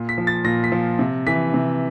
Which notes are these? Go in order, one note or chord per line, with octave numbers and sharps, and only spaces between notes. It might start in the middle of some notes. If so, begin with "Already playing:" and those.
Already playing: A#2
B6
F3
A6
A#2 A#6
B6
F3
C3
E3 B6
C3